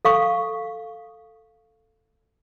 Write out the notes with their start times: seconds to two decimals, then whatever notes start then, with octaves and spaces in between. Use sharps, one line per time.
0.05 A4 F5 C#6